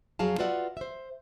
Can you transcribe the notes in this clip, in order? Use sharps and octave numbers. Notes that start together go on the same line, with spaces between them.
F2 F#3 G#4 F5 A5
F4 F#4 B4 D5 E5 F#5
C5 E5